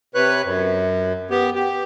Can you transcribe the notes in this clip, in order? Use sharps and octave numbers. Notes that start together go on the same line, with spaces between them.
C3 B4 C#5 F#6
F#2
B3 G4
G4